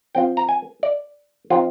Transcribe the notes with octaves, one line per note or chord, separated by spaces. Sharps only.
F3 C4 F4 G5
A#5
G#5
D5
F3 C4 D#4 F4